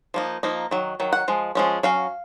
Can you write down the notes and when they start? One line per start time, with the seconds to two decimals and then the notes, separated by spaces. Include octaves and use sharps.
0.14 F3 A#3 D#4
0.43 F3 A#3 D#4
0.71 D#3 F#3
1.00 D#3 F#3
1.13 F#5
1.28 F3 G#3
1.55 F3 G#3 C#4
1.83 F#3 C#4 F5